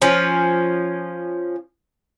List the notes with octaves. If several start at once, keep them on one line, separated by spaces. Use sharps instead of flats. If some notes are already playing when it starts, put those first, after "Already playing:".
F3 C#4